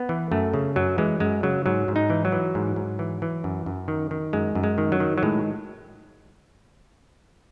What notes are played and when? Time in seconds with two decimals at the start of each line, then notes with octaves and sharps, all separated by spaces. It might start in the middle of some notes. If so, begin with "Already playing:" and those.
Already playing: B3
0.09 E3
0.32 F#2 A3
0.54 C#3
0.76 F#2 F#3
0.98 E3 G#3
1.20 F#2 G#3
1.43 C#3 F#3
1.66 G#2 F#3
1.88 G#2
1.96 D#4
2.10 E3
2.25 F#3
2.32 E3
2.55 G#2
2.76 G#2
2.99 E3
3.22 E3
3.44 F#2
3.66 F#2
3.88 D#3
4.11 D#3
4.33 F#2 G#3
4.55 F#2
4.64 G#3
4.78 D#3
4.92 F#3
5.00 D#3
5.18 F#3
5.23 A2 G#3